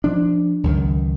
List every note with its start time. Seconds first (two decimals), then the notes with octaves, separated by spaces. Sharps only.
0.04 F3 D4
0.64 C#2 F#2 D#3